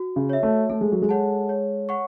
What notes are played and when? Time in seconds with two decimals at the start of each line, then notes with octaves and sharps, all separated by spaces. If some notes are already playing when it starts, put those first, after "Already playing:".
Already playing: F#4
0.16 C#3
0.29 C#5 E5
0.43 A3
0.69 A3 A4
0.81 G#3
0.92 F#3
1.02 G#3
1.09 C#5 F#5 A5
1.49 C#5
1.89 F#5 C#6